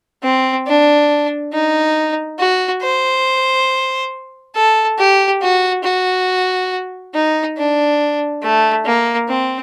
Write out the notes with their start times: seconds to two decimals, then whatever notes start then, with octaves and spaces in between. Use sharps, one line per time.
0.24 C4
0.67 D4
1.53 D#4
2.39 F#4
2.82 C5
4.55 A4
4.99 G4
5.42 F#4
5.84 F#4
7.14 D#4
7.57 D4
8.43 A3
8.86 A#3
9.29 C4